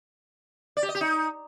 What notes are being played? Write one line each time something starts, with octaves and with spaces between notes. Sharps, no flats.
D5
G4
D#5
G4
D#4